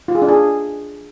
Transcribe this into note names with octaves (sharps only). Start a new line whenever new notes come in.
F4
G#4
D4
G#4